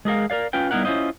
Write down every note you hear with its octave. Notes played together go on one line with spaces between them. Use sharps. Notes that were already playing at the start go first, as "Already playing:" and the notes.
G#3 G#4 A#4 F5
A#4 B4 D5 F5
C#4 F4 B4 G5
G3 B3 D#4 E4 A#4 F#5
C#4 E4 F4 C5 D#5